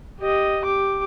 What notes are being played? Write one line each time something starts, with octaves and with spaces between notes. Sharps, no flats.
G4 D#5
G4 D6